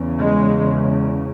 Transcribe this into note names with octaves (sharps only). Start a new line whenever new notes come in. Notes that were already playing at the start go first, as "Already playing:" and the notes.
Already playing: E2 C#3
G#3